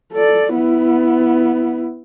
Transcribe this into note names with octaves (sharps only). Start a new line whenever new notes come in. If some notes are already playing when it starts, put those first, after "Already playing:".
A4 D5
B3 E4